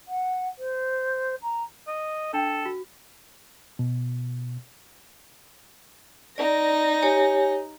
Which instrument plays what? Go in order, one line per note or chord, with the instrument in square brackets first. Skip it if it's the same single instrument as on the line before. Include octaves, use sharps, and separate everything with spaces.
[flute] F#5
C5
A#5
[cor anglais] D#5
[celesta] D4 G5 [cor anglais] A4
[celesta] F#4
[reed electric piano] B2
[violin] D#4 A#6 [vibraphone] D5
[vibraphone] G4 C#5 G#5